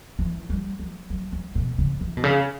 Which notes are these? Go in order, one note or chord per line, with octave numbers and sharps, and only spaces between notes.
E3
G3
F#3
F#3
F#3
B2
C#3
E3
B2
C#3